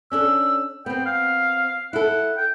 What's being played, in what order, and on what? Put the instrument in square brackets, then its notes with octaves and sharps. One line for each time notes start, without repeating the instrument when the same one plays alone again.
[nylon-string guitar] C#4 D4 A4 [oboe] E6
[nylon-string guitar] B3 C4 [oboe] G5
[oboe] F5
[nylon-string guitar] E4 A4 [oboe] F#5
[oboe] G5